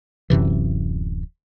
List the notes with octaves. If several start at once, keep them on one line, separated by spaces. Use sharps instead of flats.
D1 F#2 C3 E3